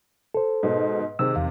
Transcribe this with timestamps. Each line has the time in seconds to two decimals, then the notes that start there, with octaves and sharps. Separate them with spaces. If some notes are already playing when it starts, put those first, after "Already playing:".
0.35 A4 C5
0.63 G#2 B2
1.19 C3 D#3 G#4 C5 E6
1.36 E2 F5